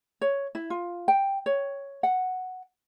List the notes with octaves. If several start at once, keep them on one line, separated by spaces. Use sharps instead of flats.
C#5
E4
F4
G5
C#5
F#5